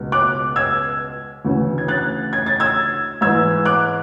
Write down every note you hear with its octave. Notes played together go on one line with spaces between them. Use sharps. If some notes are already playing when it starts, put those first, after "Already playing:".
Already playing: C#2 B2
D6 F#6
E6 G#6
D2 C#3 E3
G#6
F#6 A6
G#6
A6
E6 G#6
G#2 E3 E6 G#6
D6 F#6